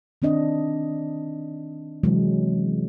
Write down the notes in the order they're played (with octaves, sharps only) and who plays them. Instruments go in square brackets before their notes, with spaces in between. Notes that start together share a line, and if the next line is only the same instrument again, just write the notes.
[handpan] D#3 C4 D4 D#5
C3 E3 F#3 G#3